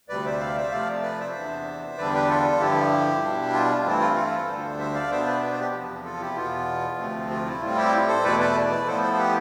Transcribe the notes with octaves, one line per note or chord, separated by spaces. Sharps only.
D2 C3 G3 B4 D5
C5 E5
D5 F5
C5 E5
C3 F3 A3 D5 F5
B4 D5
C5 E5
E2 C3 E3 B3 D4
E2 D3 G3 D4 B4 D5
G4 B4
F4 A4
G2 D3 F3 E4 G4
B2 G3 D4
F4
G2 E3 A3 C4 E4
F4
F4 A4
D2 D3 G3 D4 A4 C5
C5 E5
D5 F5
B2 B3 D4 C5 E5
B4 D5
B4
C5
G4 B4
E2 C3 F3
F4 A4
E4 G4
E2 B2 B3 F4
D2 C3 F3 A3 C4
F4
E4
A2 G3 C4 F4
E4 G4
A4 C5
E2 B2 A3 E4 B4 D5
B4 D5
B4 D5
A2 F3 B3 E4 A4 C5
A4 C5
C5
G4 B4